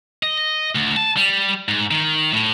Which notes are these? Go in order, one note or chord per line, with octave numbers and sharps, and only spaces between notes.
D#5
D2
A5
G3
G#2
D#3
A2